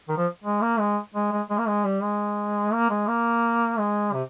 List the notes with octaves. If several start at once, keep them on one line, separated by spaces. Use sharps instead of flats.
D#3
F3
G#3
A#3
G#3
G#3
G#3
G#3
A#3
G#3
G3
G#3
A#3
G#3
A#3
G#3
C3